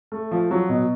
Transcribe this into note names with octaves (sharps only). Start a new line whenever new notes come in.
A3
F3
F#3
B2